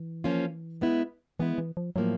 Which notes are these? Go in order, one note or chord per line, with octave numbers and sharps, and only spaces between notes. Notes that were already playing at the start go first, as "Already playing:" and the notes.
Already playing: E3
F3 A#3 C#4 F4
G#3 B3 E4
E3 G#3 B3 E4
E3
F3
A2 F3 F#3 A#3